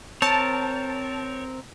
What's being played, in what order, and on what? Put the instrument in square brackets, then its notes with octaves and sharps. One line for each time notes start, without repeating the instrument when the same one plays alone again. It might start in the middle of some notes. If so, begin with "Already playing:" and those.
[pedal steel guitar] C4 A#4 [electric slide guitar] C#5 [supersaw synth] A5